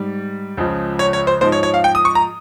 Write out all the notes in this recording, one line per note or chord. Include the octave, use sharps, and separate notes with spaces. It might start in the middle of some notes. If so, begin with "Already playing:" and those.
Already playing: G#2 G3
C#2 C#3 F3 G#3
C#5
C#5
C5
G#2 F3 G#3 C5
C#5
C#5
F5
G5
D#6
C#6
A#5